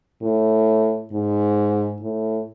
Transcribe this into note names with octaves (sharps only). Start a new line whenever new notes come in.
A2
G#2
A2